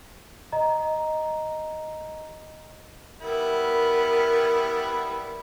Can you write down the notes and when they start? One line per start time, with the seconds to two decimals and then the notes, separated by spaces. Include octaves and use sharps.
0.52 D#5 A#5
3.21 G3 B3 E4 A#4